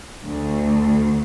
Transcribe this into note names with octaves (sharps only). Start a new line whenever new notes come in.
D2